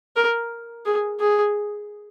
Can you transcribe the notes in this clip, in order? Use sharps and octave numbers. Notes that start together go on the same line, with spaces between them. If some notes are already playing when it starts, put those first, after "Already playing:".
A#4
G#4
G#4